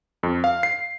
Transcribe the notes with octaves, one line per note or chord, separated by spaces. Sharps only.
F2
F5
C7